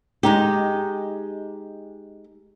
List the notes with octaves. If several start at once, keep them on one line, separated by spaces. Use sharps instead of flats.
G#3 D#4 G4